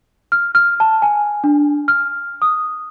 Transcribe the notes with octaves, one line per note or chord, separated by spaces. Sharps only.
F6
F6
A5
G#5
D4
F6
D#6